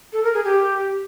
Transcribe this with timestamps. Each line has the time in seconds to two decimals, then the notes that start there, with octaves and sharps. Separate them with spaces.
0.13 A4
0.23 A#4
0.34 G#4
0.44 G4